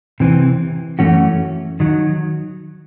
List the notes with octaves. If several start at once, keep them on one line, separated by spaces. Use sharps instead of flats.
C3 E3 C4
F#2 E3 A3 C#4 F#4
D#3 F#3